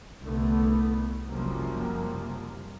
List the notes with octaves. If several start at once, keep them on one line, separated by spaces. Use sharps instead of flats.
C2 D3 A3 B3
F#1 F#2 C3 F3 G3 A#3